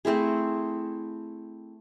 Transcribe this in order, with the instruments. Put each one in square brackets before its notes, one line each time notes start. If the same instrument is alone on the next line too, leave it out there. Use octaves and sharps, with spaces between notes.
[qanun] A3 C4 E4 G#4